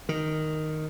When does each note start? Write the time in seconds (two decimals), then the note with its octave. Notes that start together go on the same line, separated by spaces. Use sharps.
0.09 D#3